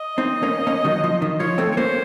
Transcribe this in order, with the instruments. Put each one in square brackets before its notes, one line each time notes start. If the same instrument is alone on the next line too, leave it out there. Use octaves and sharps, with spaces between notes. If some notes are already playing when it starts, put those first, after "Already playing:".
Already playing: [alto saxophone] D#5
[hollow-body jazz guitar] C4 D#4
A#3 C#4
A#3 C#4
D#3 F#3
F3
D#3
[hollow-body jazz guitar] F3 [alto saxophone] C#5
[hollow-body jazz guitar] A3 C4
[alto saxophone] C#5
[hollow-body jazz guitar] A#3 C#4 [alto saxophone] C5